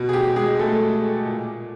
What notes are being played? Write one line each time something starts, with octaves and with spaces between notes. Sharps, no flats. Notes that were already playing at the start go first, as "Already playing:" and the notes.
Already playing: B2
G#4
G4
G#3 G#4
A3 A4
A#2